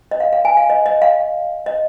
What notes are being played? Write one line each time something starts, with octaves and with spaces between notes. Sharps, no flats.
D#5
F5
F5
G#5
F5
D#5
D#5
F5
D#5